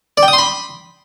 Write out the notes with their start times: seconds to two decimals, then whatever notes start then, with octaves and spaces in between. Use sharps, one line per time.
0.17 D5
0.23 G5
0.28 D#6
0.33 C6
0.38 B5